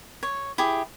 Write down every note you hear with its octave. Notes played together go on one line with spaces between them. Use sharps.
C#5
E4 G4 G#4